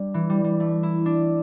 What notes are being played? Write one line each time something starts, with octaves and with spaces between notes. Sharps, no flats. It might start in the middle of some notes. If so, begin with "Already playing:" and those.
Already playing: G3 D4
E3
G3
G3
A3
E4
D4